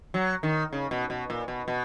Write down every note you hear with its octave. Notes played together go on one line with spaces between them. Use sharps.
F#3
D#3
C#3
B2
B2
A#2
B2
B2